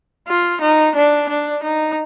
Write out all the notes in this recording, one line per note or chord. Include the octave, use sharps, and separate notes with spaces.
F4
D#4
D4
D4
D#4